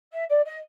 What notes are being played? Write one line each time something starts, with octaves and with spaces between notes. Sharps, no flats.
E5
D5
D#5